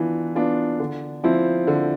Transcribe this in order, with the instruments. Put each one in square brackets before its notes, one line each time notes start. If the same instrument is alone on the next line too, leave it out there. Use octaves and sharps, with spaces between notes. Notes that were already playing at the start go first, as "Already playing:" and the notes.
Already playing: [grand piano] E3 B3 D4 F4
B3 D4 F4
D3
F3 C4 E4
D3